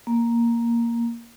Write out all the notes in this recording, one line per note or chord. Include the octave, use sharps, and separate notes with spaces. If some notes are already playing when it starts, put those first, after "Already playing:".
A#3